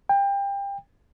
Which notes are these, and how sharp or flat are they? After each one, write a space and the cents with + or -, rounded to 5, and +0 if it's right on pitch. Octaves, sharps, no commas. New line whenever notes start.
G5 +25